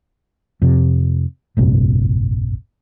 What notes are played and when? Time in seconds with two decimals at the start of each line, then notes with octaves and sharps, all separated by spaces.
0.62 F2 C3
1.57 F1 A#1 G2 C3